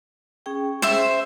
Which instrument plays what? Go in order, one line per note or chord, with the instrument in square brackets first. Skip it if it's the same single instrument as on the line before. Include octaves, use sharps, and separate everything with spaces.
[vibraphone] C#4 G#4 G5
[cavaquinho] C5 E5